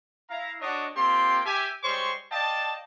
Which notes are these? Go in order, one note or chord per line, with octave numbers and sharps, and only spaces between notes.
E4 F5 A#5
D4 F#4 C#5 D#5
A#3 C4 F4 G4 G5 C6
G4 E5 G#5
G3 G#3 C5 C#5 C6 C#6
D5 D#5 F5 G5 A5